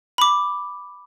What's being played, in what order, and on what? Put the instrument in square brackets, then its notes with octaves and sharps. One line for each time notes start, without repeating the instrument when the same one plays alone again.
[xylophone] B5 D6